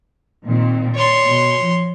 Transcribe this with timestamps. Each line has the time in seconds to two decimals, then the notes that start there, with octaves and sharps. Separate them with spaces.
0.47 A#2 D#3 C4
0.95 C#5 D5 C6
1.26 B2
1.60 F3